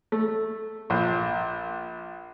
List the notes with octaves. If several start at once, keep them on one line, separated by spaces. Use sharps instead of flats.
A3
A#1